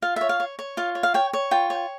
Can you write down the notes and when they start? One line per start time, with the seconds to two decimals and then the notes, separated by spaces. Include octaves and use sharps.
0.02 F4 F5
0.16 C#5 E5
0.29 F5
0.40 C#5
0.59 C#5
0.77 F4 F5
0.95 C#5
1.03 F5
1.14 C#5 G5
1.33 C#5
1.51 F4 G5
1.70 C#5